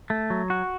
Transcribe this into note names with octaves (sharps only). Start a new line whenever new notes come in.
A3
F#3
F#4